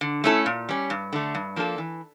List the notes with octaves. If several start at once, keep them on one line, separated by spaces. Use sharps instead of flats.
D3
A3 C#4 E4 A4
A#2
G3 C#4
G2
D3 A3
G2
F3 A#3 D4 A4
E3